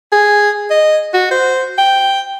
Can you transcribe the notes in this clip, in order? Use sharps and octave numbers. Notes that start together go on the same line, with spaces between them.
G#4
D#5
F#4
C5
G5